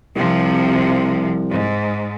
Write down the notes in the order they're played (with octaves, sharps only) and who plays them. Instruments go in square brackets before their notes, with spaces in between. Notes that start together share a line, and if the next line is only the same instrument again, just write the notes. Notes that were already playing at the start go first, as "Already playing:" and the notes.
[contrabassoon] C2 [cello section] C3 F3
[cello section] G#2